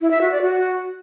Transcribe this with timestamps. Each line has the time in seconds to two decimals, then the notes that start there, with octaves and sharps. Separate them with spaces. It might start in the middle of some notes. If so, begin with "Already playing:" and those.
0.01 E4
0.11 E5
0.21 F#4
0.31 D5
0.42 F#4